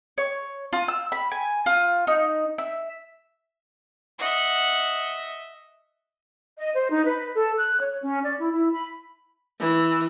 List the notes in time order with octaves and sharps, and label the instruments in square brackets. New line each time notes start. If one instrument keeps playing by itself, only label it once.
[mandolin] C#5
F4
E6
B5
G#5
F4
D#4
E5
[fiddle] D#5 E5 [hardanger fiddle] F#5
[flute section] D#5
C5
D#4
B4
A4
F#6
C#5
C#4
D5
E4
E4
B5
[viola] E3